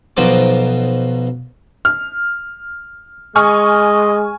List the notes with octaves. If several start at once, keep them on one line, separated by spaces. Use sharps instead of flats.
B1 B2 F3 D#4 C5 D6
F6
G#3 D#5 G#5 C#6 F6